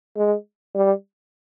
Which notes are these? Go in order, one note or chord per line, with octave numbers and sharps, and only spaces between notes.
G#3
G3